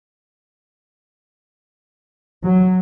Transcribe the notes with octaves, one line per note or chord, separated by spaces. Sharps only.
F#3